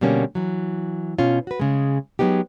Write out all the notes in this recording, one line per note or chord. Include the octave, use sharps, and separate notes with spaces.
B2 D3 G3 A#3 C#4
E3 F#3
B2 C#4 F4
F#4 B4
C#3 G#3
F#3 G#3 B3 D#4 G4